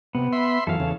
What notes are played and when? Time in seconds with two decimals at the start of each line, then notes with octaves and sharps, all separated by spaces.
0.15 C3 B3
0.32 E5 B5 C6
0.67 F#2 E3 A4 F5
0.80 E2 C#3